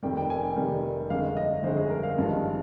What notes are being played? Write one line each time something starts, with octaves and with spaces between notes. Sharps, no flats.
F1 F2 C3 D#3 G3 G5
G5
G#5
G5
F1 F2 C3 D#3 G3
G1 F2 D3 G#3 F5
D#5
G1 F2 D3 G#3 C5
G#4
A#4
F5
G#1 G2 F3 G#3